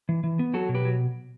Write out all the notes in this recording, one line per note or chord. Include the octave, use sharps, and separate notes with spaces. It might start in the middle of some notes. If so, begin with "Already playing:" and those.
E3
E3
B3
F#3 F#4 A4
B2
G4 B4
F#3